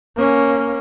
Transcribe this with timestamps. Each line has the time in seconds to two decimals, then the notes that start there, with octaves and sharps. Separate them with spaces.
0.16 A#3 C#4